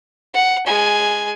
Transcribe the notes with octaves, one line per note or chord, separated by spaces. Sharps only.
F#5
G#3 G#5